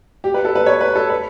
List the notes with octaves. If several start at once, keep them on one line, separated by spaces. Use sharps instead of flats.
G4
B4
A4
B4
C#5
B4
A4
B4